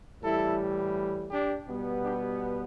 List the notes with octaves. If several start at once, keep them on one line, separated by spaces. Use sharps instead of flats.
A2 E3 G3 E4 A4
D4 G4
B2 G3 B3
D4 G4